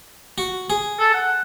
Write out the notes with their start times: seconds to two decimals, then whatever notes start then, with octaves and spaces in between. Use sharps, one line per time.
0.38 F#4
0.70 G#4
1.00 A4
1.14 F#5